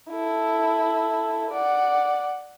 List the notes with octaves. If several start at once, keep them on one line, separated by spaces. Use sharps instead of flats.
E4 A4
D5 F#5